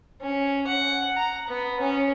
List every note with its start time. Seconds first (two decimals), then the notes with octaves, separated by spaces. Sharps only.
0.22 C#4
0.67 F#5
1.16 A#5
1.48 B3
1.80 C#4